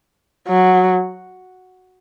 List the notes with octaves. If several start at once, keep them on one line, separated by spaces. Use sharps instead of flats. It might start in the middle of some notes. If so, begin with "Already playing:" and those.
F#3